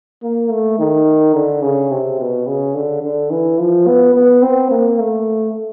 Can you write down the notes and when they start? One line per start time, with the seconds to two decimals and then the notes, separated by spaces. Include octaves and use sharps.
0.23 A#3
0.50 A3
0.79 D#3
1.35 D3
1.62 C#3
1.91 C3
2.19 B2
2.47 C#3
2.75 D3
3.03 D3
3.30 E3
3.59 F3
3.87 B3
4.15 B3
4.43 C4
4.71 A#3
4.99 A3